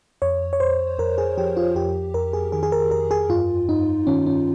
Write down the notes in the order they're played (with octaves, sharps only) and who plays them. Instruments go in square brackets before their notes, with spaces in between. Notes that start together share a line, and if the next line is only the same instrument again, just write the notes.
[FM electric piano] F2 C#5
C#5
F2 C5
F2 A#4
G#4
F3 G4
F4
F2 G4
F2 A#4
G#4
D#3 G#4
G#4
A#4
F2 A#4
G#4
G2 F4
G2 D#4
D#3 C#4
C#4